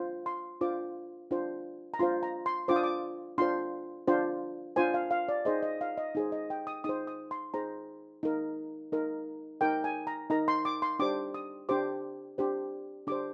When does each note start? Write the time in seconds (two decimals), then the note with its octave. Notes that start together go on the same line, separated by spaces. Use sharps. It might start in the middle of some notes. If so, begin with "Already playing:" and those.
Already playing: D4 F4 C5
0.26 C6
0.61 D4 F4 C5 D6
1.31 D4 F4 C5
1.94 A#5
1.99 D4 F4 C5 C6
2.23 A#5
2.46 C6
2.68 D4 F4 C5 D6
2.76 D#6
2.84 D6
3.38 D4 F4 C5 C6
4.08 D4 F4 C5
4.76 D4 F4 C5 G#5
4.94 F5
5.11 F5
5.28 D5
5.45 D#4 G#4 C5 D#5
5.63 D#5
5.81 F5
5.98 D#5
6.15 D#4 G#4 C5
6.32 D#5
6.50 G5
6.67 D#6
6.84 D#4 G#4 C5 D#6
7.07 D#6
7.31 C6
7.54 D#4 G#4 C5 A#5
8.23 D#4 A#4
8.92 D#4 A#4
9.61 D#4 A#4 G5
9.84 G#5
10.07 A#5
10.30 D#4 A#4 A#5
10.48 C6
10.65 D6
10.82 C6
10.99 D4 G4 C5 D6
11.34 D#6
11.69 D4 G4 C5 D6
12.38 D4 G4 C5
13.07 D4 G4 C5 D6